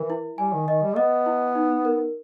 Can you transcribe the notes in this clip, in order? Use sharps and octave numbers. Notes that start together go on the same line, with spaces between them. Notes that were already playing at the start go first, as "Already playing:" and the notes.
Already playing: E3 A#4
E4
G3 G#5
D#3
D#3 D#5
G3
B3 D#5
E4
D#4
A#4